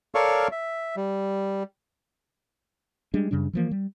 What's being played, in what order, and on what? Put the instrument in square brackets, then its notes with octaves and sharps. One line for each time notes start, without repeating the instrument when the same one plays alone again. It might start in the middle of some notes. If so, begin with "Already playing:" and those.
[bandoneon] A4 A#4 C#5 D5 F5 C#6
E5
G3
[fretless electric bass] G3 G#3 D4
F#2 C#3 G3 D4
E3 F3 A#3
G3